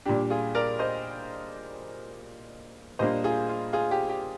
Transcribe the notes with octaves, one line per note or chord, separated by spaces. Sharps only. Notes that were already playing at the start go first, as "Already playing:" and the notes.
A#2 G3 D4 G4
F4 G#4
A#4 D5
C5 D#5
A#2 G3 A#3 D4 C5 D#5
F4 G#4
F4
F4 G#4
G4
G4